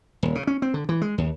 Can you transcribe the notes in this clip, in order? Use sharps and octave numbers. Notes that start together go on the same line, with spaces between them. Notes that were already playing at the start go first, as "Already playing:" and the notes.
D#1
C#3
C#4
C4
D3
E3
G#3
D#2